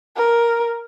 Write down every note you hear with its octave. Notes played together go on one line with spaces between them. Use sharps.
A#4